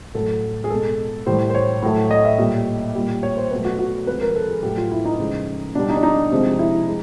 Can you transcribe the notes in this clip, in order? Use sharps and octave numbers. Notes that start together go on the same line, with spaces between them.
A2 F#3 A3 A4
G#4
B2 G#3 A4
A2 E3 G3 C5
C5
C#5
A2 F#3 A3
D#5
E5
A#2 G3
A#2 G3
C#5
C5
B2 F#3 A3 B4
F#4
F#4
C3 F3 G#3 B4
A#4
A4
G#4
A2 F#3 A3 G4
F4
E4
D#4
C#3 F3 G#3
B2 G3 D4
D#4
D4
D#4
C3 F3 G#3
E4
G#3